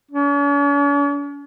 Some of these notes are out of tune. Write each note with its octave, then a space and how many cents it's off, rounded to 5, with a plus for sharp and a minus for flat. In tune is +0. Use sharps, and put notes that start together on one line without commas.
C#4 +45